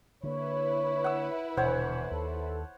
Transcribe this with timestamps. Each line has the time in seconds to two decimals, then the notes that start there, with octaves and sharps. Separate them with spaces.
0.23 D3 A#3 E4 B4 C#5
1.04 F#5 E6
1.57 D#1 B2 D3 E3 C5 C#5 F#5
2.11 D#2 A4